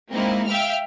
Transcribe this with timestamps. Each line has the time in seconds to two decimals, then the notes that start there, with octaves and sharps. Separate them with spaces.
0.11 G#3 A#3 C4 D#4 E4
0.47 E5 F5 G5 F6